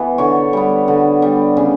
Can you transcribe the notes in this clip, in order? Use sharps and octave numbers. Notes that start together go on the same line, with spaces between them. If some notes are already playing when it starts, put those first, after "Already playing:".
Already playing: E3 B3
D3 C#5
G3 B3
D3
G3 B3
C#3